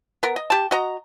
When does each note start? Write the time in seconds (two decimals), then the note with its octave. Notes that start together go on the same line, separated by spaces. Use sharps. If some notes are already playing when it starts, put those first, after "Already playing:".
0.23 B3 A#4
0.36 D#5
0.50 G4 A5
0.71 F#4 D#5 A#5